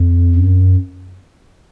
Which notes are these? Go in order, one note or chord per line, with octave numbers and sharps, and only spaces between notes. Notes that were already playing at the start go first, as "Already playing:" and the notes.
Already playing: F2
F#2